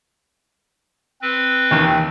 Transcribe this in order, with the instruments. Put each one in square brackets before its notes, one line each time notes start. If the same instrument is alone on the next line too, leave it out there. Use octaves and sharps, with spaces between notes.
[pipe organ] C4 B4
[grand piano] D#2 D#3 E3